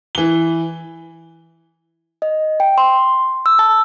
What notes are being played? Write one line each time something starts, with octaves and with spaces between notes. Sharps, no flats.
E3 G7
D#5
G5
C6
E6
A5